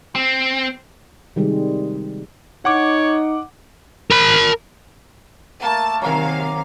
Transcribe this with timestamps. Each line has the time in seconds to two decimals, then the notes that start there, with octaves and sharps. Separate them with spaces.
0.15 C4
1.36 C3 D#3 G3 G#3
2.65 D#4 C#5 F#5 D6
4.11 A#4 B5
5.63 A3 A#3 A5
6.02 C3 D#3 F#3 A#3 F5 G#5